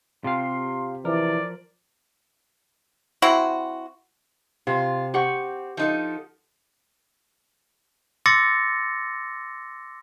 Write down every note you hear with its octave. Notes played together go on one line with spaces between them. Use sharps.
C3 F4 G4 F5 C6
E3 F3 A#4 D5
C4 E4 F#4
C3 F4
C4 G4 F#5 C#6
F3 D#4 A4
C6 D6 E6 A6 A#6 C#7